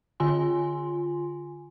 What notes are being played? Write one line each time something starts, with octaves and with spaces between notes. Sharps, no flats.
D3 F4 G#5 C6